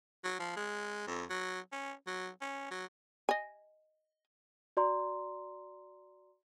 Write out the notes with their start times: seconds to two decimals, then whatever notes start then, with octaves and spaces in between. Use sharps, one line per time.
0.24 F#3
0.39 F3
0.56 G#3
1.07 F2
1.30 F#3
1.72 C#4
2.07 F#3
2.41 C#4
2.71 F#3
3.29 D#5 G#5
4.77 F#4 D5 A#5 C6